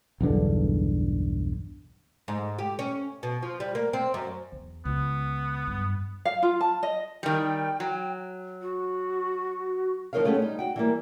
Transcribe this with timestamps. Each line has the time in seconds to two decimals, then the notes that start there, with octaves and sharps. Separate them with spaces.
0.21 B1 E2 G2 D3
2.28 G#2
2.59 G4
2.79 C#4
3.23 B2
3.43 F3
3.60 G3
3.75 A#3
3.93 C4
4.14 F#2
4.52 E2
4.85 C#2 B3
5.67 G2
6.25 F5
6.43 F4
6.61 A5
6.83 D#5
7.23 D#3 G3 G5
7.80 F#3
8.61 F#4
10.13 F3 C4 D#4 A#4 C#5 F5
10.25 G#3 A3 B3 C#4 G4
10.39 G3 D#4
10.59 F#4 G5
10.76 E3 G3 A#3